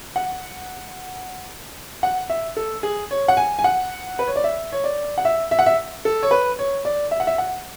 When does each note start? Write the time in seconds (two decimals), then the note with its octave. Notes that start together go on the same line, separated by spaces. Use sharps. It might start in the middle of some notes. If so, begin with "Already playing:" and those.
0.16 F#5
2.03 F#5
2.30 E5
2.57 A4
2.83 G#4
3.11 C#5
3.28 F#5
3.37 G#5
3.59 G#5
3.64 F#5
4.19 B4
4.27 C#5
4.36 D5
4.44 E5
4.72 C#5
4.84 D5
5.18 F#5
5.25 E5
5.51 E5
5.59 F#5
5.66 E5
6.05 A4
6.23 C#5
6.31 B4
6.59 C#5
6.85 D5
7.11 E5
7.20 F#5
7.27 E5
7.38 F#5